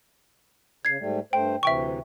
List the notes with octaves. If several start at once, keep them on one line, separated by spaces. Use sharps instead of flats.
C#3 G#6 C7
G#2 G3 A3
G2 A3 C5 G5
D2 C3 E3 E5 G5 C#6